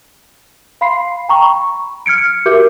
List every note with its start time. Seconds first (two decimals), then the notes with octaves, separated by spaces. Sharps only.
0.81 F5 B5 C6 C7
1.29 G5 A#5 C#6
1.44 B5
2.06 F6 G#6 C#7 D7
2.45 F#4 G4 A#4 E5 D6 G6